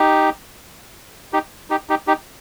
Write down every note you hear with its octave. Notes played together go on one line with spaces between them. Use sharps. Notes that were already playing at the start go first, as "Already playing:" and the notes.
Already playing: D#4 G4
D#4 G4
D#4 G4
D#4 G4
D#4 G4